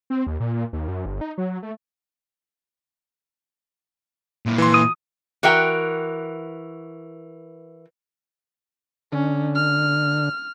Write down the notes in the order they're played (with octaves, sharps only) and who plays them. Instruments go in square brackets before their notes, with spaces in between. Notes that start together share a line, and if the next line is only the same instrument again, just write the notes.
[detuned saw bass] C4
D#2
A#2
D#2
F#2
G1
D#4
F#3
A3
[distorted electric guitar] A#2 E4
[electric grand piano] E3 C6
[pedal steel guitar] D#6
[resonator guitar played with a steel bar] E3 F#4 A#4 E5 G5
[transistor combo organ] D3 [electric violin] C#4
[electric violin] F6